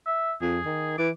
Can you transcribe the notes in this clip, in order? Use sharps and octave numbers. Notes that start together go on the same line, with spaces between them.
E5
F2 G#4
D#3
E3 D6